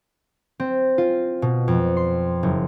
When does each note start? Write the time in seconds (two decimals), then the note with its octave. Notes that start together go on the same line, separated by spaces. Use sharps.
0.60 C4
0.98 F4
1.42 B2
1.68 F2
1.97 C6
2.43 F#1